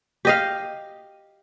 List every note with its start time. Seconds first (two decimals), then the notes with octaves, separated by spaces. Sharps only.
0.25 G4 D#5 F5